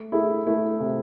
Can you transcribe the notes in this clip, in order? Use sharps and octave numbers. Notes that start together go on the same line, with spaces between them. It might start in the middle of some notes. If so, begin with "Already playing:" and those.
Already playing: A3
A3 E4 G#4
A3 E4
C3